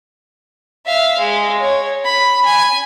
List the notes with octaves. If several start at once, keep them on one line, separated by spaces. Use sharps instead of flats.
E5 F5
G#3
C#5
B5
G#5